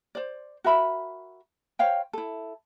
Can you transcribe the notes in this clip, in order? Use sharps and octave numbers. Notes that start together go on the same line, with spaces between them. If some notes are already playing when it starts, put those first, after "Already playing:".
C5 D5
F#4 A#4 E5 B5
C5 C#5 F5 G5
E4 A4